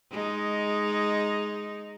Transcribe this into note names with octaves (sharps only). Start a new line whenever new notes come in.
G#3 D#4